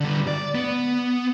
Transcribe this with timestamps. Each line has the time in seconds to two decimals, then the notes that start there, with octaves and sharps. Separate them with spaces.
0.01 D3 G3
0.28 D5
0.55 B3